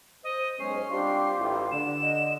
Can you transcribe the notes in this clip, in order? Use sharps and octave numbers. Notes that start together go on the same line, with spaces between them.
C5 D#5
B1 G#3 C#4 C7
G3 C4 D4 F4 G4
A1
D3 D5 E7
D#5